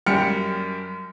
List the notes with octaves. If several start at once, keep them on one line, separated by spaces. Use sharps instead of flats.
F#2 G3 G5 F6 C#7